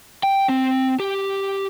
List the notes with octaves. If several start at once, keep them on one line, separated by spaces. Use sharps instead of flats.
G5
C4
G4